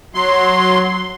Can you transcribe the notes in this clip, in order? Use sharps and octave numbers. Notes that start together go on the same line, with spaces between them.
F#3 C6